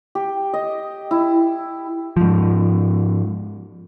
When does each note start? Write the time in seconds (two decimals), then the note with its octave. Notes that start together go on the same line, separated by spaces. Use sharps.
0.15 G4
0.53 D#5
1.11 E4
2.17 G#2 F3